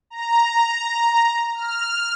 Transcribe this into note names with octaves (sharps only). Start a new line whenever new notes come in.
A#5
F6